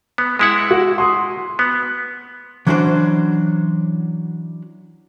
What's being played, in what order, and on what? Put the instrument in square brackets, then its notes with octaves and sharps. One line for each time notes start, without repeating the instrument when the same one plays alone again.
[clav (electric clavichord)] B3
G#3 E4 F#5
[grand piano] F#4
C6 D#6
[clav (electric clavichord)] B3
[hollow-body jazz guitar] E3 F#3 C#4 D4 F#4 C5